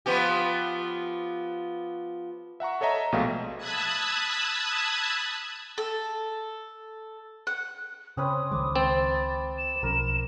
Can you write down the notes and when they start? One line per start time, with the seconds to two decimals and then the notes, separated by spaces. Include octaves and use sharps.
0.06 F3 B3 G4
2.60 E5 F#5 A#5 C#6
2.81 A4 C#5 D#5 E5 A#5
3.12 A#1 B2 G#3 A3 F5 G5
3.57 A5 B5 D#6 E6 F#6 G#6
5.78 A4
7.47 F#5
8.17 C#3 C4 C#4 B4 D#6
8.52 C#2 D#3 G#3 D6
8.76 C4 A6
9.58 E7
9.83 B1 F3 C#4 A#4